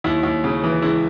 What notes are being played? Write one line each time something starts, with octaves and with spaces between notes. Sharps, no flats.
D#2 E4
D#2
C#3
E3
C#2 E4